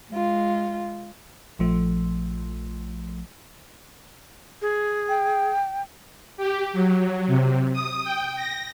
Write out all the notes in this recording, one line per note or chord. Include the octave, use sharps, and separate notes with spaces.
G#3 F4
A#1 F3 A3
G#4
G5
G4
F#3
C3
D#6
G5
A#6